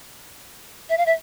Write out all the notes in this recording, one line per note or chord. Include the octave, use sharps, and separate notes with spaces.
E5
F5
E5